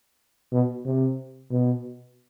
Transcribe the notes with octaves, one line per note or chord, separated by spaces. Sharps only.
B2
C3
B2